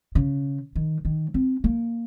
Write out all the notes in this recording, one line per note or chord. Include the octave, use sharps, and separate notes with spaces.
C#3
D#3
D#3
C4
A#3